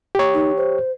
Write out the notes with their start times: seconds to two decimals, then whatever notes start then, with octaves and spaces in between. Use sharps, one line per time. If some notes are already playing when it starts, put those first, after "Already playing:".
0.15 G4 C#5
0.34 D#4
0.57 C5